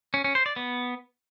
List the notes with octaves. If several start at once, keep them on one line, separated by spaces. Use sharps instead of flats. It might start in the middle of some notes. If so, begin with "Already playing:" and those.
C#4
C#4
C5
D5
B3